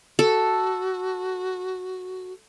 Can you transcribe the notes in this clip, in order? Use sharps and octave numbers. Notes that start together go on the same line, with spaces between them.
F#4 A4